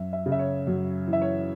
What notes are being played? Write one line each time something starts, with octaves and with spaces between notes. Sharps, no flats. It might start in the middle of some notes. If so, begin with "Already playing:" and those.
Already playing: F#2 E5
E5
C#3
E5
C#5
F#2 F#4
E3
E5
C#5